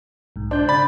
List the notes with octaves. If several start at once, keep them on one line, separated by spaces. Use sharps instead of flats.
B1 G#2
D4 C5 G6
C#3 B5 A6